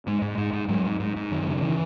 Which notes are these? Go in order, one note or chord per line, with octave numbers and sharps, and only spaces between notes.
G#2 G#3
G#2
G#2
G#2
G#2 F#3
G#2
G#2
G#2
F#2 D#3
C#3
E3